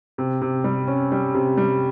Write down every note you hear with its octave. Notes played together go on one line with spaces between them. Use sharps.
C3
C3
G3
C#4
G3
C3
G3